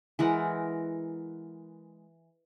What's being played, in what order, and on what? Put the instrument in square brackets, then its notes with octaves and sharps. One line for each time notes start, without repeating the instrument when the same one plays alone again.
[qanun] E3 G#3 A#4 F#5